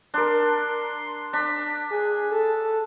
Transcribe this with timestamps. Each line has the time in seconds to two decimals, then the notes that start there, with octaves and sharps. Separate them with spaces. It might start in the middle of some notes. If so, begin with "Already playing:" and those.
0.14 D4 A#4 C6
1.33 D4 B6
1.91 G#4
2.31 A4